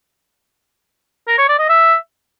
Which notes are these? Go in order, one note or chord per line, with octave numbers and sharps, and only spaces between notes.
A#4
C#5
D5
D#5
E5